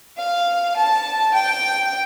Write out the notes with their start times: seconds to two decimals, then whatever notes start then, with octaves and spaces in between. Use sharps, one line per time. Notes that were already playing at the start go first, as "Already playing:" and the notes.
0.18 F5
0.76 A5
1.34 G5